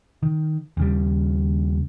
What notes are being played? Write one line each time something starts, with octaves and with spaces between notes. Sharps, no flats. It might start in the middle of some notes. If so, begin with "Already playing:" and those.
D#3
D#2 C#3 G3